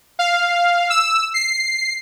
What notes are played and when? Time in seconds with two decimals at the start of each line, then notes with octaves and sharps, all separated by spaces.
0.19 F5
0.90 E6
1.34 C7